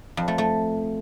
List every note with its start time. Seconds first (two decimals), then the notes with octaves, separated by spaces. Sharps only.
0.17 F2
0.28 A3
0.38 A3